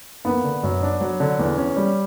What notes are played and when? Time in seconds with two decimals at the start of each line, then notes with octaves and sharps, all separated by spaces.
0.25 A#3 B3
0.44 D3
0.63 F#2
0.82 D4
1.01 F#3
1.20 D3
1.39 E2
1.57 C#4
1.77 G3